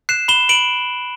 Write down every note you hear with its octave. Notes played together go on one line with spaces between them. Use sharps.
F#6 C7 E7
B5 E7 G7
B5 D7 F#7